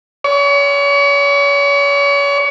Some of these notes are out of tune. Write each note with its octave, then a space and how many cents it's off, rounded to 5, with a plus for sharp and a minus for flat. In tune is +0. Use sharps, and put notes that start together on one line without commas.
C#5 +35